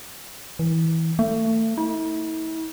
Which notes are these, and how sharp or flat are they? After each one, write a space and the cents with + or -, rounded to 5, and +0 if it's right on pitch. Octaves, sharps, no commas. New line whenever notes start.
E3 -20
A3 +30
E4 -45